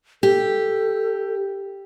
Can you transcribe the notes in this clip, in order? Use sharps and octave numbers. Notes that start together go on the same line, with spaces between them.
G4 A4